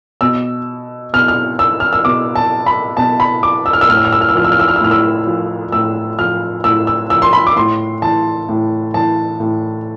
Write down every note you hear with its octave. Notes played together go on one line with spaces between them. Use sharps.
B2 E6
B2 F6
F6
E6
F6
E6
B2 D6
A5
B5
B2 A5
B5
D6
E6
F6
E6
A2 F6
E6
F6
E6
F6
E6
F3 F6
E6
F6
E6
F6
E6
A2 F6
E6
F3
A2 E6
F3 F6
A2 E6
E6
F3 E6
C6
B5
D6
A2 C6
E3 A5
A2
E3 A5
A2